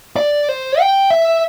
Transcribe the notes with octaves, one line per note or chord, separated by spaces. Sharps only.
D5
C5
G5
E5